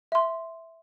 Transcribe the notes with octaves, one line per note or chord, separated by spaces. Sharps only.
E5 C6